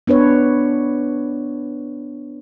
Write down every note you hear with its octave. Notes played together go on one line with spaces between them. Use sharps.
B3 D4 B4 C#5